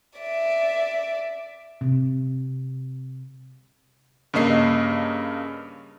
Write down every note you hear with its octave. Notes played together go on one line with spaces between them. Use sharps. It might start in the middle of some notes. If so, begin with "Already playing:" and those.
D5 E5
C3
G2 C#3 A#3 D#5 C7